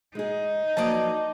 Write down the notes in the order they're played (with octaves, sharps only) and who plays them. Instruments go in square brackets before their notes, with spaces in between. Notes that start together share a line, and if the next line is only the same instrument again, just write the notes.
[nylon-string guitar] G#3 G#4 [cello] D#4
[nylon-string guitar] F3 F#3 A#3 [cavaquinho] D5 D#5 A5